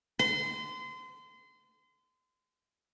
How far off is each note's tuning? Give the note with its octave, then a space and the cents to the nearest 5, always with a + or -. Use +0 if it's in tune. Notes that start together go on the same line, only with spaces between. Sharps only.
C6 -30